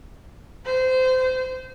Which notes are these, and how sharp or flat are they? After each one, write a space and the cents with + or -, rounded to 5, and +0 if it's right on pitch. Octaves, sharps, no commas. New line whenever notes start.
C5 -25